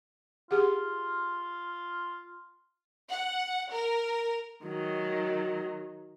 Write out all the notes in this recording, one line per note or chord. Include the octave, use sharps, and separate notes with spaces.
F4 G4 G#4 F#5
F#5
A#4
D#3 F#3